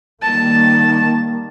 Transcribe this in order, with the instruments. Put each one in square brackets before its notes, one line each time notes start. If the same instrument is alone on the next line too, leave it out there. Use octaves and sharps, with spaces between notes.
[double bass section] D#3 G3 A#3 [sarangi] A5